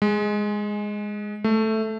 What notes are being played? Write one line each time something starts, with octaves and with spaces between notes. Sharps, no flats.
G#3
A3